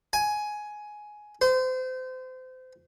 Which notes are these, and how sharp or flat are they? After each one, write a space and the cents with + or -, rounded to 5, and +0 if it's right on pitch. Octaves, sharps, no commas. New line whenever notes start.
G#5 +10
C5 -30